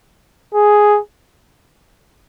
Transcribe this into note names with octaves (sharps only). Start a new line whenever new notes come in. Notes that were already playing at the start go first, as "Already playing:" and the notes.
G#4